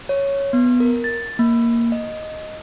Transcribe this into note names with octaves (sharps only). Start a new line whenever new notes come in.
C#5
B3
A#4
A6
A#3
D#5